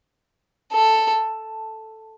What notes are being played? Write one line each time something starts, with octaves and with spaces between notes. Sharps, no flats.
A4